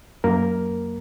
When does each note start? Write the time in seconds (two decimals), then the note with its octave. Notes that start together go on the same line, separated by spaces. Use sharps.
0.24 F#2 A#3 A#4